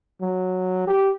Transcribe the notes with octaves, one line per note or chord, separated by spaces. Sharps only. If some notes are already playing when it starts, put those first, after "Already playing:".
F#3
G4